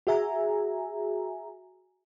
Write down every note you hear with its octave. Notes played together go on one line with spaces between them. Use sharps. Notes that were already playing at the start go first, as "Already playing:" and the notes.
F#4 G#4 E5 G#5 A#5